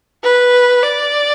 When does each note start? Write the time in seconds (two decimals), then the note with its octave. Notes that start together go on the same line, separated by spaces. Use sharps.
0.24 B4
0.82 D5